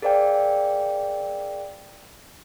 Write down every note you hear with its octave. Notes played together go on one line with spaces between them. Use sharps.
G#4 A#4 C5 D5 F5 G5